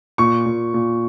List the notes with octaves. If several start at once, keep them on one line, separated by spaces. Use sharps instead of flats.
A#2 C#6
A#2
A#2